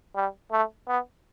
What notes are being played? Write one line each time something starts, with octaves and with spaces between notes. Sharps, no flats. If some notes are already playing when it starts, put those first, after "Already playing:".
G3
A3
B3